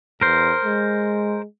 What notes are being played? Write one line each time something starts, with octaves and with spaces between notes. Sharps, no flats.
E2 A#4 C5
G#3